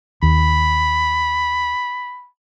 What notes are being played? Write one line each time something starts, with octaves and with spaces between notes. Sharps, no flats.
D#2 B5